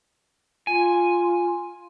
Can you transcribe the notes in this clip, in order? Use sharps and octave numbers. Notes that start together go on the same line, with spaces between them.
F4 G#5